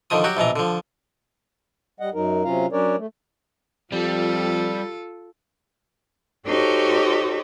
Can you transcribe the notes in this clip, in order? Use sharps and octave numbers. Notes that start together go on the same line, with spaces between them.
D3 D#3 F3 D#6
F#3 F#4 G4
A#1 B2 E3 A#5
D3 F3
G3 D#5 F#5
F#2 F#3 D#4 A#4
C3 F#3 C#4 F4 F5 A#5
F#3 C#4 D4 A#4 C#5 D5
A3
F2 G3 F4 A4
D#4 F#4 G4 A4 C5 C#5